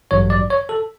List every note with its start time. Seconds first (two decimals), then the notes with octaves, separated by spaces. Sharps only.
0.11 A1 G2 F#3 C#5
0.30 D5
0.50 C#5
0.69 A4